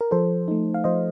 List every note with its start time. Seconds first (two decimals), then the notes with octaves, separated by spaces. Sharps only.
0.01 A#4
0.11 F3 A4 C5
0.48 A3 D#4
0.74 F5
0.84 F3 C5 D#5